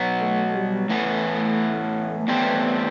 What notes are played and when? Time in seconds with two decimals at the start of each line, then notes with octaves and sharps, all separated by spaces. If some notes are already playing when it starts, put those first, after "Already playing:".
Already playing: B2 F#3 B3
0.21 A3
0.55 G3
0.89 A2 E3 A3 B3
2.20 A3
2.28 A2 E3 G3 B3 C4